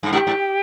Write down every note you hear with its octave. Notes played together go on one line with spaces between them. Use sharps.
G2
G#2 G4
G#2